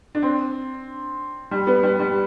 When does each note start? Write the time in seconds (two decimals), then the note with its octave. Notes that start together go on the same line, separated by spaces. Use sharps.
0.15 D4
0.23 C4
1.51 G3
1.67 B3
1.83 G3
1.99 G3